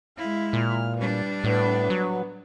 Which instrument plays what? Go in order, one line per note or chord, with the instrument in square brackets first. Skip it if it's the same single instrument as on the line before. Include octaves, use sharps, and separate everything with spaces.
[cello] G#3 E4 [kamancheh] F5
[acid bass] A#2 [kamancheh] F6
[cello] G3 D4 [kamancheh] B4
[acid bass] A2 [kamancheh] B3 B4
[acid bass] F#3